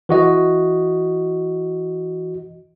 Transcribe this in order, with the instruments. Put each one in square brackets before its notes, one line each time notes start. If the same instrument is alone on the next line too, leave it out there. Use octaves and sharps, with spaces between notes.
[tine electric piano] E3 F#4 D#5